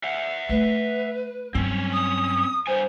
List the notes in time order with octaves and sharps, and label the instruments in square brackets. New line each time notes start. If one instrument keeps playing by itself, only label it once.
[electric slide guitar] E5 F#5
[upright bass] A3 [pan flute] B4
[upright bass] G2 F#3 [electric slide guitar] C4 C#4
[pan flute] D#6
[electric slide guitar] G2 G#5 [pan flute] C5